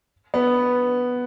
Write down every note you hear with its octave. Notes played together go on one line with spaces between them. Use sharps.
B3